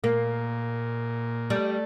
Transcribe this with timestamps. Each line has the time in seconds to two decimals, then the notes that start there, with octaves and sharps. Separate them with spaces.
0.04 A#2 A#3
1.50 G3 A3